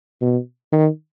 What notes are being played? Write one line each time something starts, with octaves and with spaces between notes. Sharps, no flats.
B2
D#3